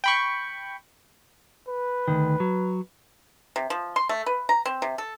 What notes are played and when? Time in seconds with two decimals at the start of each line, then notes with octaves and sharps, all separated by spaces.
0.04 G5 B5 C#6
1.68 B4
2.08 D2 G2 D#3
2.40 F#3
3.56 C3
3.70 F3
3.96 C6
4.09 A3
4.26 B4
4.49 A#5
4.66 C4
4.82 C3
4.98 A4